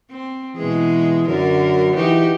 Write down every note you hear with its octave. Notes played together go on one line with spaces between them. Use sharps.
C4
B2 E3 G#3 G#4
F#2 D3 F#3 A#4
E3 D#4 F#4 G4